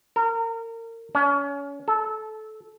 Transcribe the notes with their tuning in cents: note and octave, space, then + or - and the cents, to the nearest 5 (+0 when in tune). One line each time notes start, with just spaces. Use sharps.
A#4 -30
C#4 +30
A4 -20